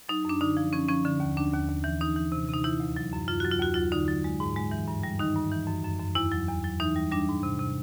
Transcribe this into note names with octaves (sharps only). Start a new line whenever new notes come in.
F#3 D#4
F#2 D4
D3 D#4
F3
F3 C#4
F3 C#4
D3
D#2
D#2 D4
D#2
D#2
E3
E3 D#4
E3
C3
C3
D#4
E3 E4
D2
F#3
F#2
F#2 F4
F#3 F#4
F4
D#2 F#4
F#3 F4
D3 D#4
F#3
G#3
G#2
G#3
E3
G2
G3
D#3 D#4
G2
E3
F#2
F#2
F#2
E2 E4
F#3
E2
F#3
E3 D#4
G3
G3 D4
G#2
C3
C3